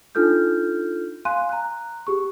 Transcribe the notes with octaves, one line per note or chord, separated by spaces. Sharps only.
D4 D#4 F4 A4 F6 G6
F5 G#5 C6 F#6 D#7
A#5 F#6
G4 G#4 C#6